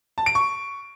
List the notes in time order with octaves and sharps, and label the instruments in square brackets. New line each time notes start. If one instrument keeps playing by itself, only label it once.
[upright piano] A5
D7
C#6